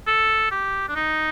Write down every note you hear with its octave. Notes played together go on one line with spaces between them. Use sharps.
A4
G4
D4
D#4